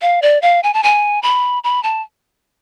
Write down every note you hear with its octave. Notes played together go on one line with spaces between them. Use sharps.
F5
D5
F5
G#5
A5
G#5
B5
B5
A5